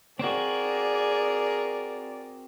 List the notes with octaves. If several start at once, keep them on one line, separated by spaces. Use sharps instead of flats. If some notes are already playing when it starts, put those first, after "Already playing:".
C4 F#4 G#4 A#4 D5